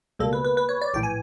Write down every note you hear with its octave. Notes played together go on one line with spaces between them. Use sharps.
C#2 B2 G3 A#3 A4
B4
B4
B4
C#5
D5
A#1 A2 E3 G5
G#5